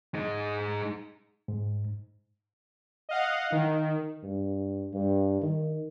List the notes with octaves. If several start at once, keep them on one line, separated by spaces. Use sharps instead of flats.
G#3 D#4
G#2
D#5 F5 F#5
D#3 D#4
G2
G2
D#3